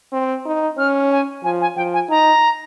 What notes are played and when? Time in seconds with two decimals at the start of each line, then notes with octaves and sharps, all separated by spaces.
0.13 C4
0.45 D#4
0.78 C#4 F6
1.11 G#5
1.44 F3 G#5
1.61 G#5
1.76 F3 G5
1.93 G#5
2.09 D#4 A#5